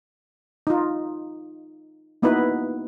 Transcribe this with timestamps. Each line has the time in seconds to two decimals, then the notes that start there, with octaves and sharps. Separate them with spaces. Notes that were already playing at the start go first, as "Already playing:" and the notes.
0.67 D#4 F4
2.22 A#3 B3 D#4 E4 F#4 B4